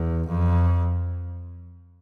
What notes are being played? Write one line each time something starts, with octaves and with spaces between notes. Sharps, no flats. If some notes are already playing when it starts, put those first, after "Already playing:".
Already playing: E2
F2